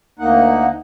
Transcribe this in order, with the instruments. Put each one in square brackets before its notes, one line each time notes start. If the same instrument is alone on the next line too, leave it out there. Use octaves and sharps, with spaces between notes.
[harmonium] D2 A#3 D#4 F#5